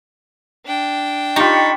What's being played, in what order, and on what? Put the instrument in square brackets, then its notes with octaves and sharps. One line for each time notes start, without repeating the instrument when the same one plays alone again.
[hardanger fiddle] D4 G5
[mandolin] D#4 [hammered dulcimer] F4 G4 [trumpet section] A5 B5 C#6